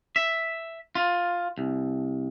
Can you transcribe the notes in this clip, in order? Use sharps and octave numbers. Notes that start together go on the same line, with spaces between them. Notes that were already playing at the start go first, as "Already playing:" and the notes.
E5
F4
C2